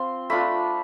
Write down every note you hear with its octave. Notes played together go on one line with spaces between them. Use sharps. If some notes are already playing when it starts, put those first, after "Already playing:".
Already playing: C4 F4 C6
A3 D4 F4 B5